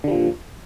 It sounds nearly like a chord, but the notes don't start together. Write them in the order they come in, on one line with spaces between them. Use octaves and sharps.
D3 G3 F3 A#2